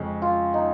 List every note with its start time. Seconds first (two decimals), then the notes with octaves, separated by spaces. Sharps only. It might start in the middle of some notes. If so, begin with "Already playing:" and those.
Already playing: F2 C#3 G#3 C#4
0.22 F4
0.54 D#4